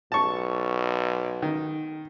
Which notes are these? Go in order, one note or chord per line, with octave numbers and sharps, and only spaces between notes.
B1 A5 C#6
D#3